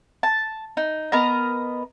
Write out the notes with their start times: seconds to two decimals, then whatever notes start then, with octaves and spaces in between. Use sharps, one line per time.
0.23 A5
0.77 D#4
1.12 B3 A#4 D#5 A#5